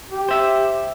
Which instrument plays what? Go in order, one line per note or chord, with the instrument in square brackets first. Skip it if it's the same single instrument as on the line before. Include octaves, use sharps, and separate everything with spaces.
[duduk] G4
[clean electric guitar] C5 E5